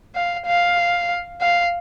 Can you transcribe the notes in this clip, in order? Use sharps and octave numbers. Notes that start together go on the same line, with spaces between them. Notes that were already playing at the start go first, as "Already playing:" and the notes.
F5
F5
F5